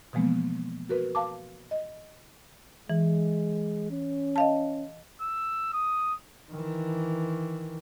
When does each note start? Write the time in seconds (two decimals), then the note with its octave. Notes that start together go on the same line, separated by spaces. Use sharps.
0.13 B2 E3 F3 G#3 A#3 B3
0.89 F#4 A#4 B4
1.15 F5 A5 D6
1.71 D#5
2.90 E3 G#3
3.90 C#4
4.36 D#5 F5 A5
5.22 E6
5.73 D#6
6.51 D#3 E3